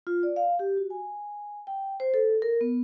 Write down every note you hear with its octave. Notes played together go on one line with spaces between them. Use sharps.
F4
D5
F5
G4
F#4
G#5
G5
C5
A4
A#4
B3